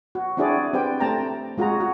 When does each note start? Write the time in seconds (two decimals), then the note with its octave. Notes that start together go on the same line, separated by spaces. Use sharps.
0.15 F#4
0.37 C4 D4 E4 F#4 G#4 D5
0.74 C4 G4 B4 D5 G5
1.00 A3 C4 G5 A5 A#5
1.58 G#3 F4 F#4 G#4 A#5
1.80 F#4